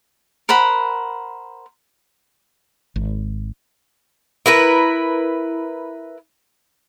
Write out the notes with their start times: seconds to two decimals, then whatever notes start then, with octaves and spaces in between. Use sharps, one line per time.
0.49 A#4 C5 F#5 B5
2.96 G#1
4.46 E4 A#4 B4